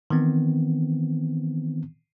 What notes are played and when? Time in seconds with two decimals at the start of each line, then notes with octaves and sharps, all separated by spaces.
0.10 D#3 E3 B3 C4